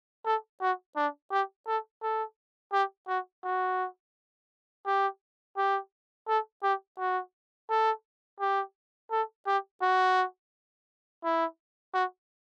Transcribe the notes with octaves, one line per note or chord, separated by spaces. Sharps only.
A4
F#4
D4
G4
A4
A4
G4
F#4
F#4
G4
G4
A4
G4
F#4
A4
G4
A4
G4
F#4
E4
F#4